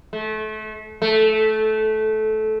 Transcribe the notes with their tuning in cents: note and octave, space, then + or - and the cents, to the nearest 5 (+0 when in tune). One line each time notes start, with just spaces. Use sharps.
A3 -30
A3 -15